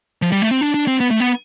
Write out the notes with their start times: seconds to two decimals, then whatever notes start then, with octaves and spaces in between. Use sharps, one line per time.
0.22 F3
0.32 G3
0.42 A3
0.51 C4
0.61 D4
0.74 D4
0.87 C4
1.00 B3
1.11 A3
1.20 B3